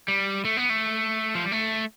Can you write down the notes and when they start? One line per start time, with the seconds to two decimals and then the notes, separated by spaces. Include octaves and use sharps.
0.08 G3
0.45 A3
0.57 B3
0.70 A3
1.35 F3
1.43 G3
1.52 A3